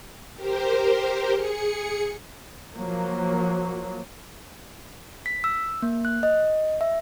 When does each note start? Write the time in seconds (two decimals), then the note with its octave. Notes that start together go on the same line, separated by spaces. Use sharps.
0.35 G4 A#4 C5
1.33 G#4 C#7
2.74 F3 F#3 A#3
5.26 B6
5.44 E6
5.82 A#3
6.05 F#6
6.23 D#5
6.81 E5